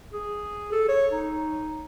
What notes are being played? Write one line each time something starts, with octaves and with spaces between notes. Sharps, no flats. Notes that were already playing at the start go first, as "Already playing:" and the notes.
G#4
A4
C#5
D#4